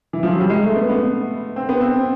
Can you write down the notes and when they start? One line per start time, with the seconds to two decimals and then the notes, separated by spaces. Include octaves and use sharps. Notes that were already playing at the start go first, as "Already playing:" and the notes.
0.13 E3
0.23 F3
0.32 F#3
0.40 G3
0.50 G#3
0.63 A3
0.76 B3
0.89 B3
1.56 C4
1.69 B3
1.81 C4